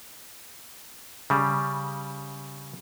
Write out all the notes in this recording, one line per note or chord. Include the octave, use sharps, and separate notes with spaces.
C#3 G3